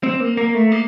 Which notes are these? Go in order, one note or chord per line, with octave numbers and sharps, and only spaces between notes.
C4
A#3
A#3
A3
A#3